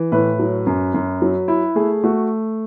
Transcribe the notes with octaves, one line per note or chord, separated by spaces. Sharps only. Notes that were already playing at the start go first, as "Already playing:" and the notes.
Already playing: E3
A2 B4
F#3
F#2
F#2
F#3
E4
A3 G#4
A3 F#4